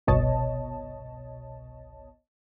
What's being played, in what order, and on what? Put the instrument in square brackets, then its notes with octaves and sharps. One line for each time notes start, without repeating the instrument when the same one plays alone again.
[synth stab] G1 C2 B2 C#5 D#5 A5